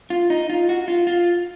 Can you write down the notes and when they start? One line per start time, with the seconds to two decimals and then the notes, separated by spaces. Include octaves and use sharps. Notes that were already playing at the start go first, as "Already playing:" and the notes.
0.10 F4
0.30 D#4
0.50 F4
0.69 F#4
0.88 F4
1.07 F4